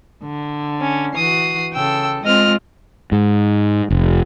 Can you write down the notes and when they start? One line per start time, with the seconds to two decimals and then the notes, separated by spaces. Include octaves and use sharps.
0.23 D3
0.81 C#4
1.15 E3 F#4 D#6 C7
1.73 C#3 A4 G5 E6
2.24 G#3 C4 F4 D#5 F6
3.12 G#2
3.90 F1